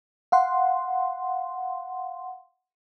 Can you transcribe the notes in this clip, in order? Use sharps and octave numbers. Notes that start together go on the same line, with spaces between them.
F5 F#5 C6